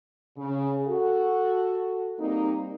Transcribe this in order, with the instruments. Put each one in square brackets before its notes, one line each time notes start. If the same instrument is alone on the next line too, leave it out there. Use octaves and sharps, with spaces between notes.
[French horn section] C#3
F#4 A4
G3 A#3 C4 D#4